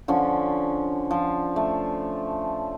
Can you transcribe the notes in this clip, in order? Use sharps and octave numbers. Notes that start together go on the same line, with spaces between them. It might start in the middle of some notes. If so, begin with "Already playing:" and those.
D3 F3 C#4
F3
A3